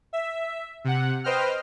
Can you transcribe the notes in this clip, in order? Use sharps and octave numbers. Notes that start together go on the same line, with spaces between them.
E5
C3 F#5
B4 C5 D#5 G5 F6